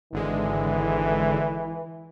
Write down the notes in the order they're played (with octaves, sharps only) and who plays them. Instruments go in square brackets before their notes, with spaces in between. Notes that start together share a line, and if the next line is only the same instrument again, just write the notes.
[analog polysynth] G#1 D3 G#3 [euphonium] E3